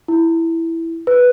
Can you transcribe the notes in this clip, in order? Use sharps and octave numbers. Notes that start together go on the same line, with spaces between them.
E4
B4